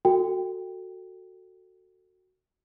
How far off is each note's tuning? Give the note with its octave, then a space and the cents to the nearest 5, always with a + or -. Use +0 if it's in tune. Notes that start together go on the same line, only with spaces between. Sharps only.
F#4 +0 A4 +20 G5 +10